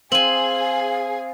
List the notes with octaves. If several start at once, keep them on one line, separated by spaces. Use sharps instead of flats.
C4 G#4 F5 G#5 F#7